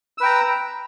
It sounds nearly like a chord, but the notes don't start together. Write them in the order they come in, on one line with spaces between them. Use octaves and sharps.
E6 B4 G5 A#5